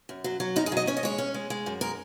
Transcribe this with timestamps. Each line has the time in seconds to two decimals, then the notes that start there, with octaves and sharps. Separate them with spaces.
0.09 F#2
0.24 F#3
0.40 F#3
0.56 F#2 D#4
0.66 G#4
0.72 F#3 D#5
0.87 C#4 C#5
0.97 D#5
1.03 G#3 C#5
1.18 C#4
1.34 G#3
1.50 G#3
1.66 F#2
1.81 G#3 A#4